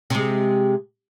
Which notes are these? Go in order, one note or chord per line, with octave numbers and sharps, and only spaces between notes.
C3 G#3